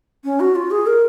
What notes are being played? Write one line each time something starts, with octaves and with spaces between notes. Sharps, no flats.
C#4
F#4
F4
G#4
A#4